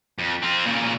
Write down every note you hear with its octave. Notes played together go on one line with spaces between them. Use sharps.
F2
C4 F4
A#2 C#3